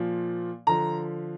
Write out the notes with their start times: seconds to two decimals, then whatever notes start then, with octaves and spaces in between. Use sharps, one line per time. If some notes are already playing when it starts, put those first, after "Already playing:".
Already playing: A#2 F3
0.67 D3 F3 A#5